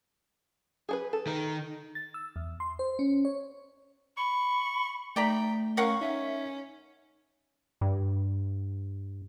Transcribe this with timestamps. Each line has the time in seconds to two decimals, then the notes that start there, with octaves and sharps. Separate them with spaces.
0.89 G#4 A4 B4
1.13 A4
1.27 D#3
1.95 A6
2.14 E6
2.36 E2
2.60 C6
2.79 C5
2.99 C#4
3.25 C#5
4.17 B5 C#6
5.16 A3 D#4 D5 G5 A#5 B5
5.77 C#4 A#4 F5 F#5 C#6
6.01 C#4 D#4 E5
7.81 G2